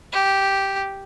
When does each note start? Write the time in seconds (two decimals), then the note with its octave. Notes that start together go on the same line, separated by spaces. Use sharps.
0.12 G4